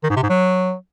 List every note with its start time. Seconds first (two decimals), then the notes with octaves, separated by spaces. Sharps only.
0.04 D#3
0.10 G#2
0.17 C3
0.23 G#2
0.29 F#3